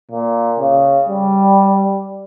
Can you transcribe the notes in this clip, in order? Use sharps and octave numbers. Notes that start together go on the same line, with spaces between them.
A#2
C#3
G3